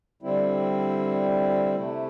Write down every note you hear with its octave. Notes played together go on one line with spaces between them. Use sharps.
D3 G3 C4 E4
C3 A3 E4